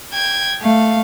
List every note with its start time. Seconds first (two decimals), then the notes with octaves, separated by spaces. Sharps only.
0.13 G5 G#6
0.62 A3 F5